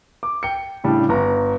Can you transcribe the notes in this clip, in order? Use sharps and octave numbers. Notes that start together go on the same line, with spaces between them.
D6
G5 C#7
A2 C#3 G3 D4
G1 A#5